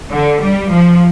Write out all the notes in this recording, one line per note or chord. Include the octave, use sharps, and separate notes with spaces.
D3
G3
F3